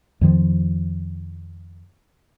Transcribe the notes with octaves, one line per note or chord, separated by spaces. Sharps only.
F2 D#3 F3